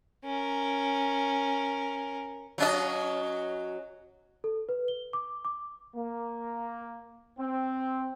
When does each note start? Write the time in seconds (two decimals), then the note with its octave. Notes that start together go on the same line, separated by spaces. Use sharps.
0.25 C#4 A#4
2.58 F#3 C#4 D#5
4.44 A4
4.69 B4
4.88 G7
5.13 D6
5.45 D6
5.96 A#3
7.39 C4